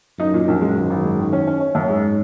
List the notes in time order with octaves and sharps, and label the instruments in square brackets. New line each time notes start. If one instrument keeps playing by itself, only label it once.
[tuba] F#2 [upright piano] D#4
[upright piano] A#2
A#1
G#3
G#1
G#1
G#3
D#3
C#4
C#4
C#4
F#2
[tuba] G#2 [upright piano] G#3